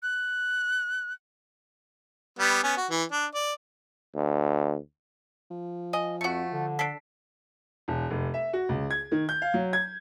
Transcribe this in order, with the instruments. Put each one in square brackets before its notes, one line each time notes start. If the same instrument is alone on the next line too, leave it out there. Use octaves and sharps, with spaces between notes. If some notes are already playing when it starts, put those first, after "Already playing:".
[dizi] F#6
[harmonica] G3 B3
B3 C#4
F#4
E3
D4
D5
[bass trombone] D2
[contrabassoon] F3
[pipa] D#5 [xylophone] G#5
[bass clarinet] F2 [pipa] A3 F#4 [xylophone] F#5 C#7
[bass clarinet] D3
[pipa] D4 A4 [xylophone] B6 C7 D7
[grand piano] E1
F1
E5
F#4
C#2
G#6
D#3
G6
F5
F#3
G#6